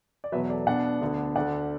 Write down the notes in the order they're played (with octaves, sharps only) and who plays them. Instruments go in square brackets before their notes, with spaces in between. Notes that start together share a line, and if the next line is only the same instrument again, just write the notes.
[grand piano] D5
E2 B2 F#3 B4 E5
A4 D5
B2 B3 D4 D5 F#5
D2 D3 B3 D4
D2 D3 A3 D5 F#5